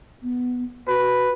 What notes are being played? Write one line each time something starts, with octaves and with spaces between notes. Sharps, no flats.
B3
F#4 B4